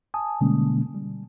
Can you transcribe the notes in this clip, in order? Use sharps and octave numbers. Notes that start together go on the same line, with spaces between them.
G#5 A5 D#6
B2 D3 G3 G#3 A#3 C#4
G3